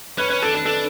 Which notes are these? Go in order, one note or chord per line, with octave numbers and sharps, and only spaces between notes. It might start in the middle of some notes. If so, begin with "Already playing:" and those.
C#4 B4
C#4 B4
D4 A4
A4
D4 A4